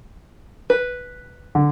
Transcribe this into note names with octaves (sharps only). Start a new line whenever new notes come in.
B4
D3